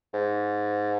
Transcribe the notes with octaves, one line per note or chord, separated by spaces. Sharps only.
G#2